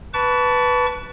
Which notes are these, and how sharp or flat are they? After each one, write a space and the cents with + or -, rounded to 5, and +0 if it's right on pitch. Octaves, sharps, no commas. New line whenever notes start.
B4 +0 A5 +0 C#6 +40